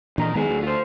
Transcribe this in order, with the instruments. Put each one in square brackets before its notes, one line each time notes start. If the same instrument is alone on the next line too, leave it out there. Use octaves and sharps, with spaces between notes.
[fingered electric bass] A#2 E3 D4 [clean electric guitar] D#3 A#5
[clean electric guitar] F#2 G#4 [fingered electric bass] D#3 G#3 B3
[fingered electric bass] D2
[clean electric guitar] F4 C5